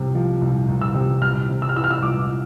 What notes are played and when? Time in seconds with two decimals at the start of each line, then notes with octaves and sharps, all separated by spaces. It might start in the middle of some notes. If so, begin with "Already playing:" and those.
Already playing: C2 C3
0.15 F3
0.41 C2
0.69 C2
0.81 E6
0.95 C3
1.22 C2 F6
1.49 C3
1.62 E6
1.69 F6
1.75 E3 E6
1.84 F6
1.91 E6
2.02 C2 D6